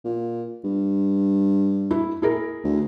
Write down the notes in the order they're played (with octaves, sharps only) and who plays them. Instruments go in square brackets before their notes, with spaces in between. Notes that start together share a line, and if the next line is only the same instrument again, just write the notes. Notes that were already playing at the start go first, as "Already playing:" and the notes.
[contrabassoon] A#2
G2
[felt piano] E4
E4 G#4 A#4
[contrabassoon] D2